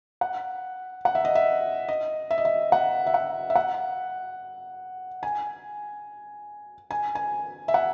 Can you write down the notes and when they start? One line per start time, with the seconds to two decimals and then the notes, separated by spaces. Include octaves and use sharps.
0.21 F#5
1.05 F#5
1.15 E5
1.25 D#5
1.35 E5
1.88 D#5
2.31 E5
2.38 D#5
2.45 E5
2.72 F#5
3.07 E5
3.14 F#5
3.50 E5
3.55 F#5
5.23 G#5
6.91 G#5
7.15 G#5
7.68 E5
7.74 F#5